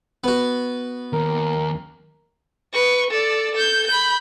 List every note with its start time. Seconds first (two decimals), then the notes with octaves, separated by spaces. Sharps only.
0.24 B3 F#4
1.13 D#2 A#4
2.73 B4 C#6
3.10 A4 D5
3.55 A4 G6
3.87 B5 G6